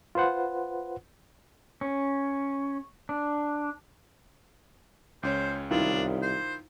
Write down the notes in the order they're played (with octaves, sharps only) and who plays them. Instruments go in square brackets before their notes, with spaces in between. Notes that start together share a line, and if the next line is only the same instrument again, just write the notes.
[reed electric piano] F4 B4 C5 F#5
[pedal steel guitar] C#4
D4
[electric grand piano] C#2 C#4 C#5 [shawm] C5
[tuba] C2 [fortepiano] D#3 E4 F4 [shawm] D4
[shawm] C5